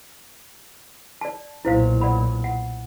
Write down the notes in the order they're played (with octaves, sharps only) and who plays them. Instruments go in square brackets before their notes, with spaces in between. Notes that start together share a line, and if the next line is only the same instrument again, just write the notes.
[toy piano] D5 A5
[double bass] B1 A#2 [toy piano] E4 C5 F5
[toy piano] D5 F#5 B5
F#5